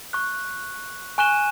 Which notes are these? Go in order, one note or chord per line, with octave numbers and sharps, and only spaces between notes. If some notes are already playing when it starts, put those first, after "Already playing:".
C#6 F#6
G#5 C#6 F#6 D#7 E7 G7